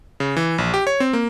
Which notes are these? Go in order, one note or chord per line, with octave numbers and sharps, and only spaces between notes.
C#3
E3
A#1
G4
C#5
C4
A#3